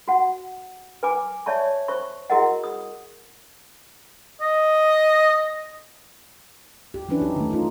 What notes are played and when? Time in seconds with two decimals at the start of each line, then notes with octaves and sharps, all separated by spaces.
0.08 F#4 F#5
1.03 B4 G#5 D6
1.46 C#5 D5 E5 A5 C#6
1.88 C5 C#6
2.30 E4 F#4 G#4 A#4 D#5 F#5
2.64 D#6
4.41 D#5
6.94 G4
7.09 E3 F#3 C#4 D4 E4 B4
7.22 D#4 G4
7.36 D#3 A3
7.51 D#4 F4